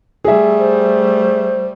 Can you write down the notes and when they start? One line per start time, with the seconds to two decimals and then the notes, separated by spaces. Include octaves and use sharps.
0.24 G3 A3 G#4 E5
0.58 C5